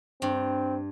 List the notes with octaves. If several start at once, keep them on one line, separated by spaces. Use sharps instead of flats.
G2 C4